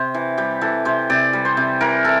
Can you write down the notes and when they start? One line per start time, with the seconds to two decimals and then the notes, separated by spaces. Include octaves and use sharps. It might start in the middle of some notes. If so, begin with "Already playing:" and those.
Already playing: C3 C5
0.14 E3
0.38 G3 G4
0.61 E3 A4
0.85 C3 C5
1.10 C3 D5
1.33 G3
1.45 C5
1.57 C3
1.81 E3 A#4
2.05 E3 A4